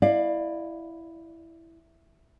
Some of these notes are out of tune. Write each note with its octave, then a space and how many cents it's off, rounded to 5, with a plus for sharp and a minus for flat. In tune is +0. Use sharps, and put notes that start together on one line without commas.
E4 +0 D5 +25 F5 +0